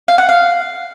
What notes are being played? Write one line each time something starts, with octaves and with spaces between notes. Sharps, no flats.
F5
F#5
F5